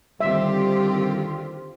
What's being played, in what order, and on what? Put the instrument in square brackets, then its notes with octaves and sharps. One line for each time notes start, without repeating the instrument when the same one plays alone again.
[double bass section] D3 D#3 C4 [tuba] G3 [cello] F4 G4 [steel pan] E5